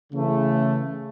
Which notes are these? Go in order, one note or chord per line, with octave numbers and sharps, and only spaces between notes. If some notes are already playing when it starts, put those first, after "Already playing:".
C#3 E3 A3